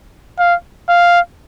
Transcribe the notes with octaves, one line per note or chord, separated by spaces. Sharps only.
F5
F5